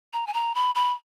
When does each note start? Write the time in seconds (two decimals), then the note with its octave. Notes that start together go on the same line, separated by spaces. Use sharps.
0.13 A#5
0.27 G#5
0.34 A#5
0.55 B5
0.75 B5